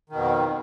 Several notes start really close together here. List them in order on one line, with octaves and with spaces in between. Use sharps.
D#3 B2 F2